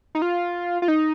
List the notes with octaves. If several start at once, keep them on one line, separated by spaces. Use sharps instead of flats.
D#4
F4
F4
D#4